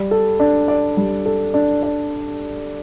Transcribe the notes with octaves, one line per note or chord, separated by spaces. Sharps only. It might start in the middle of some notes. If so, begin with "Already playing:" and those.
Already playing: G3
A4
D4
D5
G3
A4
D4
D5